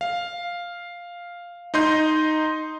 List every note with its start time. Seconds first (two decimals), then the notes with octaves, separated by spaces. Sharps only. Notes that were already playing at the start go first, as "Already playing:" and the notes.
0.01 F5
1.74 D#4 D#5 C6 G6